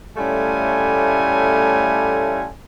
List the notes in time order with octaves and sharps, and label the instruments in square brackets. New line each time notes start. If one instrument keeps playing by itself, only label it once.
[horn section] A2 G3 A3 C#4 F4 G#5